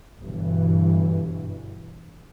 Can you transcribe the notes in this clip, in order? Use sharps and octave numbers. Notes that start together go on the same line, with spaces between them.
G1 G2 B2 E3